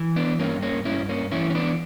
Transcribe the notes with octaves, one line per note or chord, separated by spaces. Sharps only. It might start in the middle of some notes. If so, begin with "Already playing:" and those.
Already playing: E3
B3 D4
G2 A#3 C#4
A#3 C#4
G2 C#4 E4
A#3 C#4
E3 C#4 E4
C#4
B3 D4